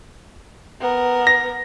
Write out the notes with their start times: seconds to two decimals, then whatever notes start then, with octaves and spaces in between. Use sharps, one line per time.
0.81 B3 A#4
1.27 A#6